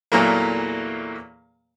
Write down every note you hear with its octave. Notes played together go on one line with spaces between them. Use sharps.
E2 A#2 E3 F#3 A3 A#3